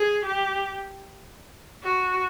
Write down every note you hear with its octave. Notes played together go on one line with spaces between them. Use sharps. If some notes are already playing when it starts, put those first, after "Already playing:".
Already playing: G#4
G4
F#4